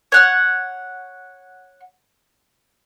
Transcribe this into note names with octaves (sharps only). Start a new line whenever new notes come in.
C#5 F#5 F6